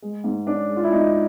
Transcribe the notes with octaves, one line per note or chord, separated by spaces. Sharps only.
G#3
G#2
C#4 D4
G#3
F4
E4
G#2 D#4